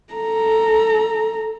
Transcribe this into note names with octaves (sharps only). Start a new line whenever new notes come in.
A4 A#5